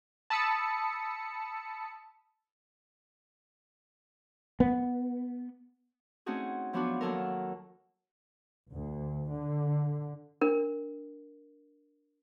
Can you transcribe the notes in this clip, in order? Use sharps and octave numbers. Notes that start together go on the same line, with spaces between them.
A5 B5 D#6 E6 C#7
B3
A3 C4 C#4 D#4 F#4 G#4
F3 F#3 B3 D4 F4 F#4
D#2 F#3 A4 A#4
D2
D3
D4 A#4